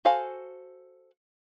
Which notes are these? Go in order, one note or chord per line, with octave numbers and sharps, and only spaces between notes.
F#4 A4 C5 F5 G#5